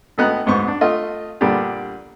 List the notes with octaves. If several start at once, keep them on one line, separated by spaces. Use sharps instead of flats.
G#1 A3 B3 D#5 A#5 F#6
D2 G#2 B3 C5 C#6
D4
A3 F4 D#5
A#2 D3 G3 B3 D4 G4